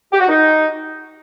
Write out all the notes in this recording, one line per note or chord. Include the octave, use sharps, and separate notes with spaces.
G4
F#4
D#4